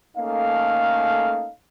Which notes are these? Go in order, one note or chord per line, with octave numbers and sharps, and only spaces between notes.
A3 A#3 C#4 D#4 A4 F5